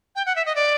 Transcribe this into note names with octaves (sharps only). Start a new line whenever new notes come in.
G5
F#5
E5
D#5
D5